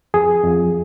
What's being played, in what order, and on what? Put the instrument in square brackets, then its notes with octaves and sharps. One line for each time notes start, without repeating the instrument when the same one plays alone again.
[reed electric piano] F2 G#4
F2